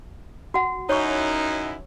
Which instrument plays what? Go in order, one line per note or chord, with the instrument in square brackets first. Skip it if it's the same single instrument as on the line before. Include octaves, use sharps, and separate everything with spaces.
[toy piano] F#4 F#5
[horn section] F#2 D#4 E4 [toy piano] C#5 C#6